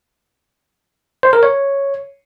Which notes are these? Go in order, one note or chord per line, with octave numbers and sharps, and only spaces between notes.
C5
A#4
C#5